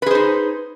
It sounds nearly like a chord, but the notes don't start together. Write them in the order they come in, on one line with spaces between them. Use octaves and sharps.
B4 G#4 C5 D#4